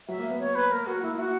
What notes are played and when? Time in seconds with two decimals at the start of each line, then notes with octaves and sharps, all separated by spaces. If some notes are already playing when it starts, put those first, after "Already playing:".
0.08 F#3 E5
0.19 A#3
0.30 B3
0.39 C#5
0.55 B4
0.71 A#3 A#4
0.87 F#4
1.02 A#3 E4
1.13 E4
1.19 F#4